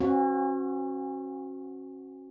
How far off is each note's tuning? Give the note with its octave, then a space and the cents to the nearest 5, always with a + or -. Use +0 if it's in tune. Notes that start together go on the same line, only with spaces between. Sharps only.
C#4 -40 F#4 +0 C5 -35